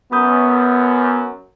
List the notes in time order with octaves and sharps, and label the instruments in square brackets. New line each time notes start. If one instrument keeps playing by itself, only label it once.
[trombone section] F#2 [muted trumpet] B3 [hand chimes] B5 D#6 G6